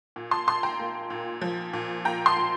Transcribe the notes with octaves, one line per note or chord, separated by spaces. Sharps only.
A#2
A5 C6
A#2 A5 C6
G5 A#5
A#3
A#2
F3
A#2
A#3 G5 A#5
A5 C6
A#2